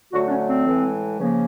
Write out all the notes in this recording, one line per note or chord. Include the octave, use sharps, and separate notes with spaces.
D3 F#3 A3 F#4
D4
C#4
C4
A2 E3 G#3
C#3 F3 A#3